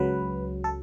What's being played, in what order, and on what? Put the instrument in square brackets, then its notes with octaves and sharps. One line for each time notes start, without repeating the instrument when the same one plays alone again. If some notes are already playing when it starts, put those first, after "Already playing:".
Already playing: [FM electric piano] C#2 C#3 F#3 B4
A4